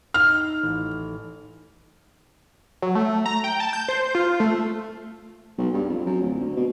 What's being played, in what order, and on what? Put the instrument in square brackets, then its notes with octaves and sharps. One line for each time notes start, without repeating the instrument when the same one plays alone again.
[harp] D#4 [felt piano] F6
[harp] A1
[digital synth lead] F#3
A3
A#5
G5
A5
G6
C5
F4
A3
[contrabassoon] B1
G2
F2
F#2
D1
D2
B2